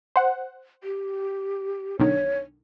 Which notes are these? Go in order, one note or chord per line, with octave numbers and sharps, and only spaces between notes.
C5 F#5
G4
B1 D3 D#3 C#5